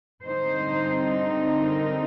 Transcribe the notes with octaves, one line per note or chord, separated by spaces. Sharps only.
D3 G3 C4 D#4 C5
A#4